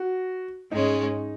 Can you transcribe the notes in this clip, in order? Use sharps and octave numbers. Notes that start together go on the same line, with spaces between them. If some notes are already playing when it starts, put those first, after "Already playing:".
Already playing: F#4
G#2 G#3 C#4 D#4